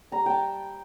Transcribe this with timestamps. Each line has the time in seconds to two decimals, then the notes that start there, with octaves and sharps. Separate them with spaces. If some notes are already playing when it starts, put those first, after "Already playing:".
0.12 G3 A#5
0.26 G5 A5